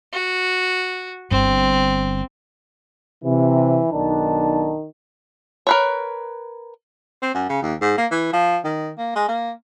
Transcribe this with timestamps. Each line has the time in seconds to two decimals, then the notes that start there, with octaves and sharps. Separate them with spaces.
0.13 F#4
1.31 G1 G2 C4
3.24 C3 E3
3.92 B1 D#3 D4 A5
5.67 A#4 B4 C#5
7.22 C4
7.35 F#2
7.49 C#3
7.63 D#2
7.82 G#2
7.98 A#3
8.11 E3
8.33 F3
8.65 D#3
8.98 A#3
9.15 G#3
9.29 A#3